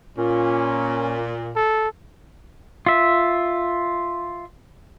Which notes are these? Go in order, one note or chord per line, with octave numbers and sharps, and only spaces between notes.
A#2 C#4
A4
F4 E5